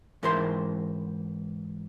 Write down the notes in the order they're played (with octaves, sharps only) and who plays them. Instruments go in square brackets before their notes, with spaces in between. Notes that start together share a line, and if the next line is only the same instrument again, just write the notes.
[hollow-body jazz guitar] G#2 E3 A#4 C5 E5 C6